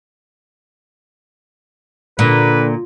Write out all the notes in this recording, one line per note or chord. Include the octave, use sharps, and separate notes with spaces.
A#2 D3 B4